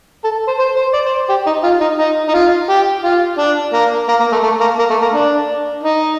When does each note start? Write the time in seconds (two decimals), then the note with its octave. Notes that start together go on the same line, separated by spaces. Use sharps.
0.24 A4
0.47 C5
0.59 C5
0.76 C5
0.93 D5
1.06 C5
1.29 G4
1.46 D#4
1.64 F4
1.81 D#4
1.99 D#4
2.29 D#4
2.34 F4
2.69 G4
3.04 F4
3.39 D4
3.73 A#3
4.09 A#3
4.20 A#3
4.32 A3
4.43 A3
4.61 A#3
4.79 A#3
4.90 A3
5.02 A#3
5.13 D4
5.83 D#4